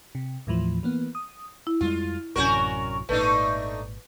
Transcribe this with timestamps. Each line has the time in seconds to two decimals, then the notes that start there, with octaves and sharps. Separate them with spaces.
0.15 C3
0.47 D#2 A2 E3 F3
0.83 E3 A#3 B3
1.15 D#6
1.67 E4
1.81 F2 G3 G#3 F4
2.36 A1 F#2 C3 C#4 F#4 A#4 C#6 G6
3.09 G#1 A#2 A3 D4 D#4 B4